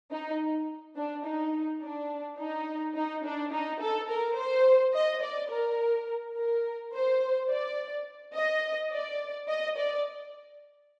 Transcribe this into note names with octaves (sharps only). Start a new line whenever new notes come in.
D#4
D4
D#4
D4
D#4
D#4
D4
D#4
A4
A#4
C5
D#5
D5
A#4
A#4
C5
D5
D#5
D5
D#5
D5